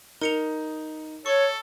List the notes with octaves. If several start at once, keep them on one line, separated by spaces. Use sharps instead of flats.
D#4 A#4 C#7 F7
A4 C#5 C#6